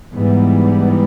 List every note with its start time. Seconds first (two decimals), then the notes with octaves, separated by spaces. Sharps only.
0.14 G#2 E3 G3 B3